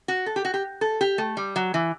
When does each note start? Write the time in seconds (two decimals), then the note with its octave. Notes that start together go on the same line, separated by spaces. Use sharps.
0.08 F#4
0.26 A4
0.36 G4
0.45 F#4
0.54 G4
0.81 A4
1.01 G4
1.18 A3
1.37 G3
1.56 F#3
1.74 E3